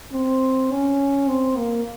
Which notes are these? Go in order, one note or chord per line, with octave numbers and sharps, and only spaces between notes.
C4
C#4
C4
A#3